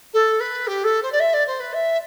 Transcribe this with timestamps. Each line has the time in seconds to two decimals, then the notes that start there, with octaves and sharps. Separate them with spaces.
0.13 A4
0.40 B4
0.67 G4
0.84 A4
1.02 C5
1.12 D5
1.20 E5
1.33 D5
1.47 C5
1.60 B4
1.73 E5